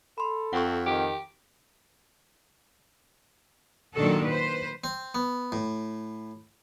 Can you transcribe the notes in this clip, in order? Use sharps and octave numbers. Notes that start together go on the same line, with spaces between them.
A4 B5 C6
F2 C4 F#5 C#6
D#3 G4
A#2 D#3 F#3 D4 F#4 A4
B4 C5
C4
B3
A2